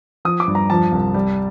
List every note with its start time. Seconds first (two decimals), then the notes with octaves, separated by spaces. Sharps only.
0.25 F3 D#6
0.40 D6
0.48 G2
0.55 A#5
0.70 F3 A5
0.92 C2
1.14 G3